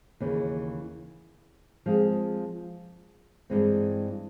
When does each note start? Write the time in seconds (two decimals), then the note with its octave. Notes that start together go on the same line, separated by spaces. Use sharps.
0.20 D#2 C#3 E3
1.86 F3 G#3 C4 F4 G#4
3.50 G2 E3 G#3 C4